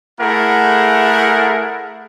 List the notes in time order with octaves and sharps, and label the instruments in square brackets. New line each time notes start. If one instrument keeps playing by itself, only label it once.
[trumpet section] A3 E4 G#4 A#4 F#5